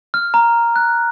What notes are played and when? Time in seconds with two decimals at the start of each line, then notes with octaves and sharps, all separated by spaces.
0.14 F6
0.34 A#5
0.76 F#6